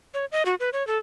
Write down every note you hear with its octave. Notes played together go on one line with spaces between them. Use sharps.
C#5
D#5
F#4
B4
C#5
A4